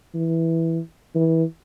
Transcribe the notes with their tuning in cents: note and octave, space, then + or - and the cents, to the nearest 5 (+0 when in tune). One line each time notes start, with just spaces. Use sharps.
E3 -5
E3 -20